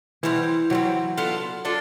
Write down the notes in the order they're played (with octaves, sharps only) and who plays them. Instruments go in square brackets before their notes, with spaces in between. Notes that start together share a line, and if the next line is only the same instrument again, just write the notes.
[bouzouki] B2 G3 C4 [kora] E3
[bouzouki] B2 G3 C4 [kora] F#3
[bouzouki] B3 D4 F4 A4
D4 F4 A4